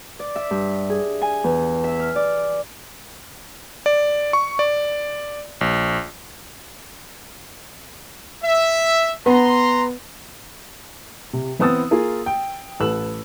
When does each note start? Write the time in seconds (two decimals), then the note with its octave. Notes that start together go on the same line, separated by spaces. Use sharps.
0.19 D5
0.36 E5
0.51 G2
0.90 G#4
1.22 G#5
1.44 E2
1.84 E5
1.99 F6
2.16 D5
3.86 D5
4.33 C#6
4.59 D5
5.61 A#1
8.44 E5
9.26 B3 B4 A#5 C6
11.33 C3
11.59 E3 B3 C4 D#6 E6 A6
11.91 A#3 F4 G#4 A#4
12.26 G5
12.80 A1 A4 B4 E6 F#7